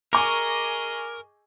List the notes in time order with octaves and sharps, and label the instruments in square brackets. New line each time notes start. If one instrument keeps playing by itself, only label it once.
[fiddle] G#4 D#5 [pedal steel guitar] A#4 [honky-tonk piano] G#5 C#6 D6